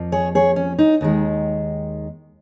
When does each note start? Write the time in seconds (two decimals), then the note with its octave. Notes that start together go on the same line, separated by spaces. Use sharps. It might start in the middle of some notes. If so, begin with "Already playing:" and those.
Already playing: F2 F3 A#3
0.12 G#4 C#5
0.35 G#4 C#5
0.56 C#4
0.79 D#4
1.01 D#2 D#3 G#3